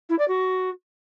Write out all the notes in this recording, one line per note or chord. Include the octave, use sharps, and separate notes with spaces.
E4
D5
F#4